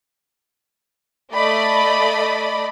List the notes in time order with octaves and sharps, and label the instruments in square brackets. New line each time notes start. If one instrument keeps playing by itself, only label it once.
[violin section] A3 D5 D#5 B5